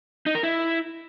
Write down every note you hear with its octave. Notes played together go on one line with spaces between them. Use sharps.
D#4
A#4
E4